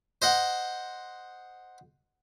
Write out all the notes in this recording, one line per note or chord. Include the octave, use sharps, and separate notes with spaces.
C5 D#5 F#5